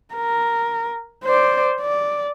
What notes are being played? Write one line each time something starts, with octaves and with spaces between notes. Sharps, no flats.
A#4
C5 D5
D5